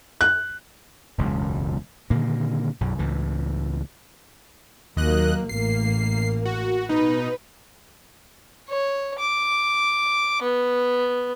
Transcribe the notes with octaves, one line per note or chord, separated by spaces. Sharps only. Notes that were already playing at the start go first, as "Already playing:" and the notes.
F#6
E1 C#2 F#2
A#2 D3 D#3 A#3
B1 F#2
C#2 A2 E3
D#2 F#3 A#3 D#5 F#6
A1 A#3 C7
F#4
B2 D#4 B4
C#5
D6
B3